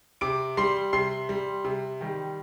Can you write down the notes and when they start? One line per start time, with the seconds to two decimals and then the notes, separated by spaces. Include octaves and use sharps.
0.21 C3 D6 D7
0.57 G3 C6 C7
0.93 C3 C6 C7
1.29 G3
1.64 C3
2.01 D#3 G3